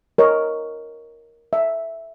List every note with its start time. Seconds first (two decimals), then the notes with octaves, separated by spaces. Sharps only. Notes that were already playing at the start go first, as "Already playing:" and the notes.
0.18 A#4 C#5 D#5
1.53 E5